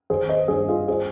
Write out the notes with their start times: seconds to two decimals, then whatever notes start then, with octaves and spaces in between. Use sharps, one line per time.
0.10 G#1 G#4 C5
0.29 C5 D#5
0.48 G2 G#4 C5
0.68 F4 G#4
0.88 G#4 C5